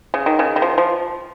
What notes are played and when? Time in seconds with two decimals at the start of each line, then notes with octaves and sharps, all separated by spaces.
0.14 C#3
0.26 D#3
0.39 C#3
0.56 D#3
0.62 F3
0.78 F3